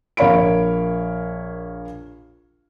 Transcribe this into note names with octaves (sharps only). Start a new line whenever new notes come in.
A#1 A#3 C#5 F5 B5 D7